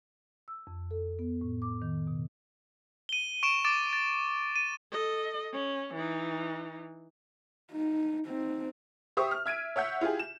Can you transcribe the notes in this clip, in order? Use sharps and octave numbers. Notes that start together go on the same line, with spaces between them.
E6
F2
A4
B3
A2
D6
D#3
B2
D#7 G7
C#6 D7 E7
D6 A6 D7 E7
A6
D#7
A4 D#5
C#4
E3 D#4
D#4
C4 D#4
G4 C5 E5 C#6 D#6
F6
E5 G#6 D7 D#7
C#5 E5 F#5 G6
E4 F4 G4 G#4
E7